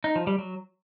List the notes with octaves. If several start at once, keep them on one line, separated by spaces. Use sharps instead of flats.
D#4
F3
G3
F#3